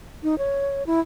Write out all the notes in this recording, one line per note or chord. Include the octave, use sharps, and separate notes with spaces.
D#4
C#5
E4